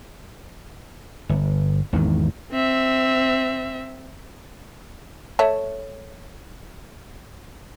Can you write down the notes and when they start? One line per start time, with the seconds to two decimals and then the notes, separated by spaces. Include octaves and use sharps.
1.29 G1
1.93 G#1 E2 D#3
2.52 C4 E5
5.39 A3 C#5 E5